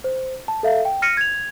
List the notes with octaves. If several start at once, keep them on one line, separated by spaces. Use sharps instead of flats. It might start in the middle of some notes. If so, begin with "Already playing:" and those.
C5
A5
A4 E5 F5
G5
F6 A#6 C#7 D#7
G#6 F7